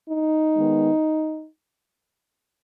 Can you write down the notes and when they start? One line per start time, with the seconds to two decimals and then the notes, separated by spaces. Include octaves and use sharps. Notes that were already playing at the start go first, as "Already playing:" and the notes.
0.09 D#4
0.56 D#3 G#3 B3